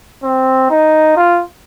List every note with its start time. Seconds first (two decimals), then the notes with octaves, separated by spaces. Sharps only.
0.24 C4
0.70 D#4
1.16 F4